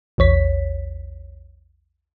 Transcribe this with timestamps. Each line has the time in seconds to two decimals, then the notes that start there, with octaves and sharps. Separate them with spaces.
0.18 A#1 E2 C#5 B6